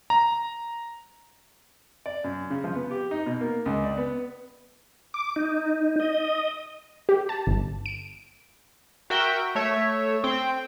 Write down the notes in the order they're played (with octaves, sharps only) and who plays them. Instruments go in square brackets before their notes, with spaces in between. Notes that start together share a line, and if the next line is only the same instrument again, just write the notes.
[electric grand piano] A#5
[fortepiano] D5
F#2
C#3
F3
B3
G4
D#4
B2
A#3
C#2
D5
B3
[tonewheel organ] D6
D#4
D#5
[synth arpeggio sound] G4
A5
G1
D7
[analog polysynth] F#4 A#4 E5 G5
A3 C#5 E5
C4 G5